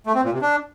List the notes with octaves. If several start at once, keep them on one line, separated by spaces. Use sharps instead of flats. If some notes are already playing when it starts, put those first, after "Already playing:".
A3
C4
A#2
C3
D4